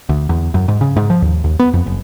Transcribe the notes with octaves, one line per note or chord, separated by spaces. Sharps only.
D2
E2
F#2
G#2
C#3
G#2
F3
D#2
D#2
B3
F2
F#1